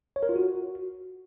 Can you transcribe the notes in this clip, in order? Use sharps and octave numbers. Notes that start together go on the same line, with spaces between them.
C#5
A#4
F4
F#4